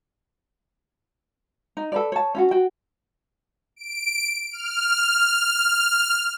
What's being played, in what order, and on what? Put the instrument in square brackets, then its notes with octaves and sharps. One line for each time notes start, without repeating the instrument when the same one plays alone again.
[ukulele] D#4
A4 B4 D5
C#5 A5
C#4 F4 F#4
F#4 G5
[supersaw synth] D7
F6